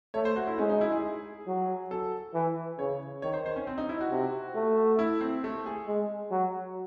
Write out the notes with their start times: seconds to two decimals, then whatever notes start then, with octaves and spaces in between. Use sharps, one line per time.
0.14 A3 C#5
0.25 C5
0.36 F#4
0.47 E4
0.58 G#3 C#4
0.69 D#4
0.81 E4
0.92 G#4
1.47 F#3
1.91 A4
2.34 E3
2.79 C#3 C#5
3.22 D#3 C#5
3.34 C5
3.46 C5
3.56 C#4
3.67 C4
3.78 D#4
3.89 E4
4.01 F#4
4.11 C3
4.55 A3
4.99 E4
5.21 C4
5.44 A3
5.66 G#4
5.87 G#3
6.31 F#3